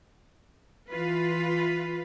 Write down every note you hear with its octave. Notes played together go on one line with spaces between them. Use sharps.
E3 F4 B4